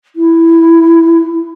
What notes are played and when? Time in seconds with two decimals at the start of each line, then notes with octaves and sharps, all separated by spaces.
0.15 E4